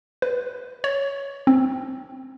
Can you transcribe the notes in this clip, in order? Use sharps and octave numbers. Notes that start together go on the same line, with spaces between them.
B4
C#5
C4